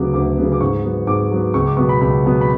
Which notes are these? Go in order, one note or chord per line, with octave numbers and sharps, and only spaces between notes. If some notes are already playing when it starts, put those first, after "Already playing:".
Already playing: D2 C#3 F#3 B3 D6
D2 D6
C#3 F#3 B3
D6
G#2 C#6
F#3 B3
G#2 D6
F#3 B3
C#2 C#6
D6
B2 F#3 B3 C#6
B5
C#2 B5
B2 F#3 B3
B5